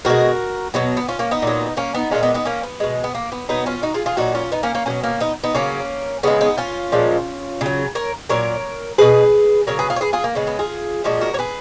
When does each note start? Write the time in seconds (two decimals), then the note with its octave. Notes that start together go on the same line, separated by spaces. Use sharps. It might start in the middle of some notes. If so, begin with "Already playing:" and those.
0.05 B2 G#3 F#4 A#4
0.74 B2 F#3 B3
0.97 B3
1.09 C#4 F4
1.19 A#3 C#4
1.31 B3 D#4
1.42 A#2 F#3
1.77 A#3 C#4
1.95 B3 D#4
2.11 A#2 G#3 C#4 F4
2.23 B3 D#4
2.34 B3 D#4
2.45 A#3 C#4
2.63 B3
2.80 B2 G#3
3.04 B3
3.15 A#3
3.32 B3
3.49 B2 F#3 B3 D#4
3.66 C#4 F4
3.83 D#4 F#4
3.94 F4 G#4
4.06 F4 G#4
4.17 A#2 F#3 D#4 F#4
4.35 C#4 F4
4.52 B3 D#4
4.63 A#3 C#4
4.75 A#3 C#4
4.86 B2 F#3 A#3 C#4
5.03 A#3 C#4
5.20 B3 D#4
5.44 B3 D#4
5.54 C#3 F#3 A#3 C#4
6.23 C#3 G#3 B3
6.41 B3 D#4
6.58 C#4 F4
6.92 A#2 F3 G#3
7.61 C#3 F#3
7.95 A#4 C#5
8.30 A#2 F#3 A#4 C#5
8.98 B2 F#3 G#4 B4
9.67 C#3 F#3 A#4 C#5
9.79 G#4 B4
9.90 F4 G#4
9.96 C#5
10.01 G#4 B4
10.13 F4 G#4
10.24 A#3
10.35 C#3 G#3 B3
10.47 B3
10.59 F4 G#4
11.04 A#2 F3 G#3 F#4 A#4
11.21 F#4 A#4
11.34 C#5
11.39 G#4 B4